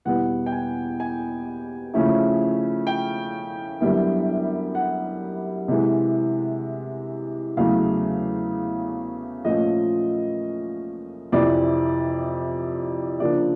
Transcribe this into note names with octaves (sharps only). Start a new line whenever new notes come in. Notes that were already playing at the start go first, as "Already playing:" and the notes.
E2 B2 G3 B3 F#5
G5
G#5
G#5
C#3 F3 A3 C#4 E4
G5
F#2 D3 G3 B3 E4
F#5
C3 E3 G#3
E2 C#3 F#3 A3 F5
A#2 F3 A3 C#4 F4 D#5
F2 C3 E3 D5
C#3 F3 A#3 D4 D5